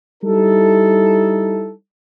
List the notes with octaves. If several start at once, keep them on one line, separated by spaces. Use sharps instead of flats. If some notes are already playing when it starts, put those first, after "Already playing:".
G3 D#4 E4 A4